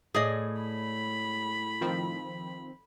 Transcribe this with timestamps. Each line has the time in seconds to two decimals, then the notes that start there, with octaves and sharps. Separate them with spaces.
0.15 A2 G#4 D5 D#5
0.62 B5
1.81 D#3 F3 C4